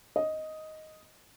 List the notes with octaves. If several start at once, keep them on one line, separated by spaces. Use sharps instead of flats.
D#5